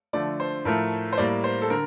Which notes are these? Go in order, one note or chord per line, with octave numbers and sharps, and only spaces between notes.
D3 F3 A3 D5
C5
A2 F3 A3 A#4
C5
A2 G3 A#3 D5
C5
A4
D3 A#4